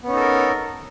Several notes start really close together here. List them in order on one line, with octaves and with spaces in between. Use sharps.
B3 C#4 D#4 A4 A#4